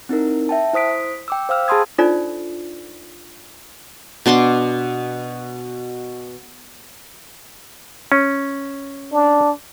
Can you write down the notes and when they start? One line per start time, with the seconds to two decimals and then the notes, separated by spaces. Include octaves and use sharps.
0.09 C4 D#4 E4 A#4
0.49 E5 G5 A5
0.73 E4 C5 D#6 B6 D7
1.28 G5 D6 E6
1.49 C5 F5 G5 E6 F6
1.68 G#4 A5 B5 C6 D#6 G#6
1.98 D4 D#4 F4 A4 C5 D5
4.26 B2 D4 C6 D6
8.12 C#4
9.13 D4